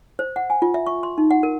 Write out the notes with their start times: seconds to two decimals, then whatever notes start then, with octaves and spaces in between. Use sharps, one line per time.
0.19 C5
0.36 F#5
0.50 G#5
0.62 F4
0.74 E5
0.87 C#6
1.03 C6
1.18 D#4
1.31 F#5
1.43 A#4